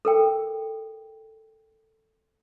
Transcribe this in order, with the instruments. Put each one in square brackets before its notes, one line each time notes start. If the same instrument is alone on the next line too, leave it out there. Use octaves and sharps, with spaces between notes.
[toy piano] A4 A#4 G5